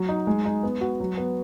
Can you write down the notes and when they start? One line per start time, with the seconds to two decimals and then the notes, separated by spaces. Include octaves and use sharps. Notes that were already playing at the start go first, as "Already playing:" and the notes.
Already playing: F#3 F#4
0.09 D#4
0.27 G#3
0.45 D#4
0.63 B3
0.81 F#4
1.00 F#3
1.18 B3